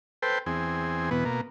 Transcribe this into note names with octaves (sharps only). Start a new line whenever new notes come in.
A4 B4 C5 G5
E2 C4 G#4
E2 B2 B3
B2 A#3